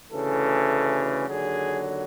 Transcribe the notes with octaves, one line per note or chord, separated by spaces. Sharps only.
D2 C#3 E3 A4
D#2 D3 F#3 G#4